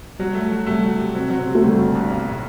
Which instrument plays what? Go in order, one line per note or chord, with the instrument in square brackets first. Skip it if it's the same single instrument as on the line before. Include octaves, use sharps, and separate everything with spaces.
[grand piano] F#3 [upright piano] G3
[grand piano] A3
F#3
[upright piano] G3 [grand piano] A3
[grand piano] F#3
C3
[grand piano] F#3 [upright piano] C4
[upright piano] C4
[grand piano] F#3
[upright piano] C4
[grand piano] C3
[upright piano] A3
[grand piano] G1 [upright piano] G3
[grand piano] G1
G2
B1
A2